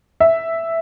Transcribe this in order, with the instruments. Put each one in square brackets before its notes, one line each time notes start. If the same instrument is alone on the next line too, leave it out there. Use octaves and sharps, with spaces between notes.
[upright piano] E5